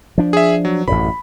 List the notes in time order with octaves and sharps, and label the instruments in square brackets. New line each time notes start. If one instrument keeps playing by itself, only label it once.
[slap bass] F3 D4
[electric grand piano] G#4 E5
F#3
[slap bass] A1 F#2 A2 [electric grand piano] B5